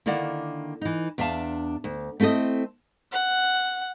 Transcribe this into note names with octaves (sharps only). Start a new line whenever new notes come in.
D3 D#3 A#3 E4 D5 F#5
E3 D#4
E2 D4 E5 F5 A5
D2
A3 C4 E4 A4 D#5
F#5